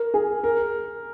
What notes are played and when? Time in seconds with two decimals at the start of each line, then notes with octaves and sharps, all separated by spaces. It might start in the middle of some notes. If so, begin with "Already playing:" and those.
Already playing: A#4
0.14 G#4
0.44 A#4